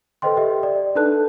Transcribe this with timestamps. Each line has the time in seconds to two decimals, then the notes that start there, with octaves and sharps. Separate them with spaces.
0.22 A4 B4 C5 D#5 G5 C6
0.37 G4 D#5 E5
0.63 D5
0.95 D4 D#4 A4 B4 A5 F#6